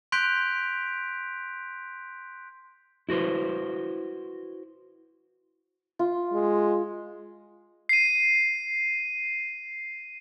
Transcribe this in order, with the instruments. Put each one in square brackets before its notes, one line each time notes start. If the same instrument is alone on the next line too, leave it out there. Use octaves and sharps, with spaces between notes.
[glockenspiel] C6 F#6 G6 B6 D7 F7
[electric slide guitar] E4 F#4 B4 C5
[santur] F4
[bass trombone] G#3
[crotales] C7 D#7